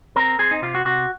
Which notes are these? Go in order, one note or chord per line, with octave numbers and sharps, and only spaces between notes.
C4 A#4
C4 G#4
D#4
C3 F4
F#4
C3 F#4